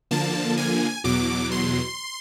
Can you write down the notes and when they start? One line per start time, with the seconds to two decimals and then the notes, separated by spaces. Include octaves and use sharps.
0.11 D3 F3 A#3 A5
0.57 G#5
1.04 E2 B2 F#3 D6
1.51 C6